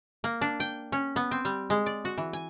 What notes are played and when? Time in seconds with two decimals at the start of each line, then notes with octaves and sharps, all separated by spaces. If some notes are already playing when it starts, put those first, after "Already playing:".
0.24 A#3
0.41 D4
0.60 G5
0.92 C#4
1.16 B3
1.31 C4
1.45 G3
1.70 G#3
1.86 D5
2.05 F#4
2.18 E3
2.33 G#5